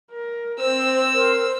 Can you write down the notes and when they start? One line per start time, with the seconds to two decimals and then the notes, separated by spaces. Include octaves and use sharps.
0.12 A#4
0.60 C4 C5 E6
1.14 A#4 C5